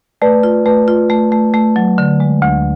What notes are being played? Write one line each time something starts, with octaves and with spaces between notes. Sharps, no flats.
A3 B4 D5
F4
A3 B4
F4
A3
A3
A3
F#3
D3
G#3
D2